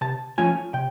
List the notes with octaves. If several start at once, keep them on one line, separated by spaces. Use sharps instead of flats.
C3 A5
F3 A3 C#4 F4 G#5
C3 G5